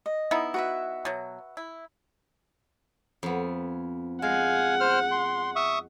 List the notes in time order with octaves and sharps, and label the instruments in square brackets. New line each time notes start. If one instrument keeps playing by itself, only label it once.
[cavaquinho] D#5
[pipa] B3 D#4 E4
[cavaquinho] F#4 B4 E5
[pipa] B2 F#3
E4
[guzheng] F2 B3
[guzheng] G#3 [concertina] F5 G#5 [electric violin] F#5
[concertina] C5 F6
C6
E5 C#6 D#6